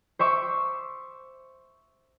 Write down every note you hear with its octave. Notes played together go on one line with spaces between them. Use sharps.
C5 E5 C#6 D6